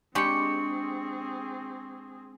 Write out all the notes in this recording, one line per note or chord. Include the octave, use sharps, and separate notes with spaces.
G#3 C4 D4 G4 G#4 C#6 C#7